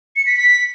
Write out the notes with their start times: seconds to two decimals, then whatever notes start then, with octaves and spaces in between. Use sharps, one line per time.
0.16 C#7
0.26 B6
0.36 B6